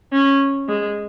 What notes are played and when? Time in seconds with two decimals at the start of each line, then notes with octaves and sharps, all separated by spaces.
0.13 C#4
0.68 G#3